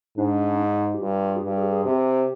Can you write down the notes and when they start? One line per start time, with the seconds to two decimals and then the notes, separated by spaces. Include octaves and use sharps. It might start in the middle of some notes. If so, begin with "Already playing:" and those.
0.17 G#2 D4
0.53 D4
0.59 D#4
0.95 G4
1.01 G2 F4
1.36 G#4
1.44 G2 G4
1.57 G#4
1.72 G#4
1.85 C3 G4